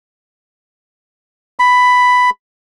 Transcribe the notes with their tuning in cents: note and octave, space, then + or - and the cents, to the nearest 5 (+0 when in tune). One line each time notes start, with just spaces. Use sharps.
B5 +5